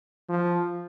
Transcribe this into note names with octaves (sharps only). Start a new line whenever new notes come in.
F3